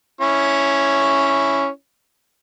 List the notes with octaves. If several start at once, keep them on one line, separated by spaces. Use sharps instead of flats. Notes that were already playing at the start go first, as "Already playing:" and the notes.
C#4 E4 C#5